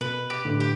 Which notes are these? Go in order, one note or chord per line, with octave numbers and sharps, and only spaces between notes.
B2 B4
G4
A2 D3
G4